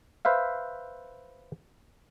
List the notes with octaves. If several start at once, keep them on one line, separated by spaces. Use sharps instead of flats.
B4 C5 E5 F5